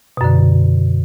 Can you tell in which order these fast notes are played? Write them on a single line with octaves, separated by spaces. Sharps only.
B2 F#2 D3